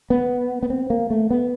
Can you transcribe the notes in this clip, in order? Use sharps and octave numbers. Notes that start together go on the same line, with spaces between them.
B3
B3
C4
A#3
A3
B3